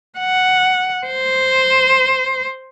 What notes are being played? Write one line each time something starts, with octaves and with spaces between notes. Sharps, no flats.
F#5
C5